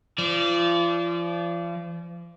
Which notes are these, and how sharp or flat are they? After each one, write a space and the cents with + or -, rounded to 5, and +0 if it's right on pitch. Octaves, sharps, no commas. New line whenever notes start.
F3 -35 D5 -20